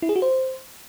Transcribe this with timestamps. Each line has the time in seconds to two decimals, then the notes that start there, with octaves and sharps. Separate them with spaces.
0.02 E4
0.09 G#4
0.16 F#4
0.22 C5